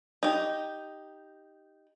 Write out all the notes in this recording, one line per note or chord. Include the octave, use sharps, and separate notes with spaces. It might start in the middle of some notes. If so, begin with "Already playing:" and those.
D#4 G4